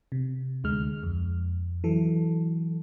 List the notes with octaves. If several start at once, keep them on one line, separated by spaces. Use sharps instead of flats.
C3
D2 D3 G#3 F6
F2
E3 F#3 A4